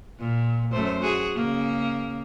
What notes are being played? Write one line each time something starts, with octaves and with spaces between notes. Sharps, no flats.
A#2
F#2 A3 C5
F#4 G#4
C#3 A#3